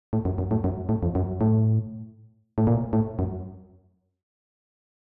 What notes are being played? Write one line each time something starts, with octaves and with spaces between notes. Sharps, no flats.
A2
F#2
F#2
A2
F#2
A2
F2
F#2
A2
A2
A#2
A2
F#2